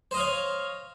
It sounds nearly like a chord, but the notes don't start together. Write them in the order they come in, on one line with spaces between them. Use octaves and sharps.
C5 D#5 F5 C#5